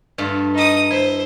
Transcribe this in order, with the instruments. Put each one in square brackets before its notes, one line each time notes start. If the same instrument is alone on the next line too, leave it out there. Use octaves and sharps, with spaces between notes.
[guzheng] G2 A3 F4
[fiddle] D#4 D#6
[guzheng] E4 [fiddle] C5